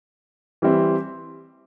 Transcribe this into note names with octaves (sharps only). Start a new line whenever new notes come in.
E3 G3 C4 E4